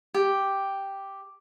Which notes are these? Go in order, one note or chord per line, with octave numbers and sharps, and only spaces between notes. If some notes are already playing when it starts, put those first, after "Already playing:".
G4